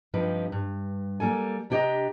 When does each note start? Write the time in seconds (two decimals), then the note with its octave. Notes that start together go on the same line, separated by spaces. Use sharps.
0.14 G2 F3 C4 D#4 G4 B4
0.52 G2
1.20 G3 A#3 A4 G#5
1.70 C3 D4 G4 C#5 D#5 A#5